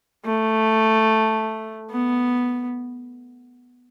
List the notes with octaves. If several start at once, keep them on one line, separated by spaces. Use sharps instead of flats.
A3
B3